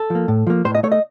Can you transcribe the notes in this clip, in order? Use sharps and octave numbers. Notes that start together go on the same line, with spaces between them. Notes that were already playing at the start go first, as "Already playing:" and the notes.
Already playing: A4
F3 A#3
A2
F3 A#3
A2 C5
D#5
A3 C#5
D#5